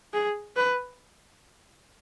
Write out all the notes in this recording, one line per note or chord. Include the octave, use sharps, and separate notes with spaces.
G#4
B4